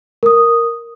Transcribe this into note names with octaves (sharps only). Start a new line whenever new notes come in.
A#4 D#6